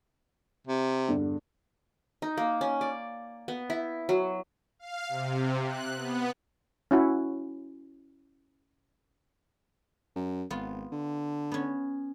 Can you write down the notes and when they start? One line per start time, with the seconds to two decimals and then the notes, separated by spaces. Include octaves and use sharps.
0.67 C3
1.08 E2 G2 D3
2.22 D#4
2.38 A#3
2.61 C#4
2.81 D5
3.48 B3
3.70 E4
4.09 F#3
4.79 F5
5.09 C3
5.66 F#6
5.97 B3
6.91 C#4 E4 F#4
10.16 F#2
10.50 G#1 B3 F4
10.92 D3
11.52 B3 C#4